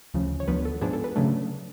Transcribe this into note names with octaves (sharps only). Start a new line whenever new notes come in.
D2 C#3 F3
C#5
D2 D3 F3 B3 B4
A4
G#2 F3 B3 D4 G#4
A4
B4
C#3 F#3 A3 D4